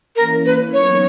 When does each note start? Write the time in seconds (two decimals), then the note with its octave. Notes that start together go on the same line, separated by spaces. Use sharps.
0.16 E3 A#3 C#4 A#4
0.46 B4
0.73 F#3 B3 D#4 A#4 C#5